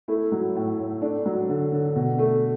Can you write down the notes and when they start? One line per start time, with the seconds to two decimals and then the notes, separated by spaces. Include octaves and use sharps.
0.08 A3 E4
0.32 F#3
0.56 A2
0.79 A2
1.02 A3 D4
1.25 F#3
1.49 D3
1.72 D3
1.96 B2
2.19 A3